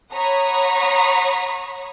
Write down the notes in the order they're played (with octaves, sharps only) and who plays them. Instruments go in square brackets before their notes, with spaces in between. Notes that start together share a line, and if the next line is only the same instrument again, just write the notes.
[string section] C#5 F#5 A#5 B5 C#6 D#6